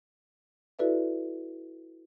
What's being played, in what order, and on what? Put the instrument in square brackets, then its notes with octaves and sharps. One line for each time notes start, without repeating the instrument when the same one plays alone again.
[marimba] E4 F#4 A4 B4 D5 E5